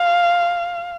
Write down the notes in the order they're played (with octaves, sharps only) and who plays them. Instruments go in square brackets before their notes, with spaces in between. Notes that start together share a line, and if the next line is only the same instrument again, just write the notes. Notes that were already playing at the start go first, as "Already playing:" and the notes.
Already playing: [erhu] F5